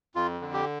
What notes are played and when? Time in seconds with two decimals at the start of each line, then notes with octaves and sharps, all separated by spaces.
0.15 F2 F4
0.41 D3
0.53 G4